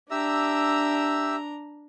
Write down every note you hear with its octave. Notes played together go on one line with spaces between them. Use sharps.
D4 G4 E5 A#5 E6